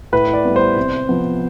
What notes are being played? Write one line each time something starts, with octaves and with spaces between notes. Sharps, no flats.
A2 B4
D5
G3 B3
C5
C3
F3 B3